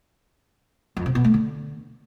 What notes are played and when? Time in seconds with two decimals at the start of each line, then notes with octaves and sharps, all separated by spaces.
0.97 F2
1.06 C3
1.15 B2
1.24 A3
1.34 D3